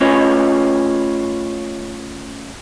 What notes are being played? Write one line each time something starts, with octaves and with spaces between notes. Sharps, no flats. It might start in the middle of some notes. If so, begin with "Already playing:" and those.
A3 C#4 F4 B4 C#5 D#5